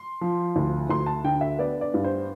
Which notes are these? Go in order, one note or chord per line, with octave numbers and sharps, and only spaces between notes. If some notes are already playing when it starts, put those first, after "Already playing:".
Already playing: C6
F3
D2
D2 C6
A5
D3 G5
E5
B3 D5
D5
G2
C5